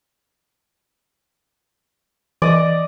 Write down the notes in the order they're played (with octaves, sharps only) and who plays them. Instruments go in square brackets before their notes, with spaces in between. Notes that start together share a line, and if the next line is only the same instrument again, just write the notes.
[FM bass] E3 [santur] D5 D#5